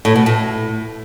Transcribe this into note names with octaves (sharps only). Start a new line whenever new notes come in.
A2
B2
A2